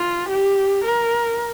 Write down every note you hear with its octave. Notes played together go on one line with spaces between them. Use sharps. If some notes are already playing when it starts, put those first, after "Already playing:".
Already playing: F4
G4
A#4